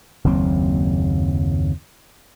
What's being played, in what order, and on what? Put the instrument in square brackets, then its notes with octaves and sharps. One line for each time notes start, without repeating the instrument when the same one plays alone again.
[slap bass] F#1 D#2 F#3 C4